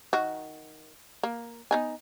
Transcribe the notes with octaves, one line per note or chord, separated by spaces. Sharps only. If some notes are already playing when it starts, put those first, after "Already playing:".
D#3 F#4
A#3
B3 D#4 G#5